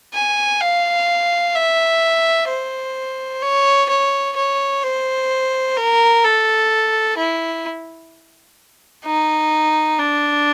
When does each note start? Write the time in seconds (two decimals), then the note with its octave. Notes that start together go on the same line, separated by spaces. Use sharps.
0.14 G#5
0.61 F5
1.55 E5
2.48 C5
3.42 C#5
3.89 C#5
4.36 C#5
4.83 C5
5.77 A#4
6.24 A4
7.18 E4
9.05 D#4
9.99 D4